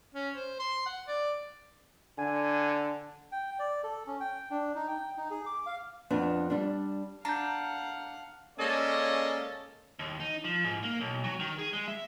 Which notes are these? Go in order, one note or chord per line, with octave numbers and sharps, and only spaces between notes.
C#4
C5
C6
F#5
D5
D3 G#5
G5
D5
A4
C#4
G5
D4
D#4
G5
D#4
G#4
D6
F5
F2 B3 D4
G3 D4
D4 F5 F#5 A#5 G6
G#3 A#3 C#4 A4 D5 D#5
D#2
D#4
F3
G#2
A#3
B1
F#3
D#3
G#4
G#3
E5